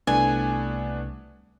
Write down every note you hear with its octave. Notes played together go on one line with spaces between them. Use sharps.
C2 A3 B3 D4 G#5